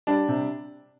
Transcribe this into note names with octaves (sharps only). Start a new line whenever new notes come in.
G3 D4
C3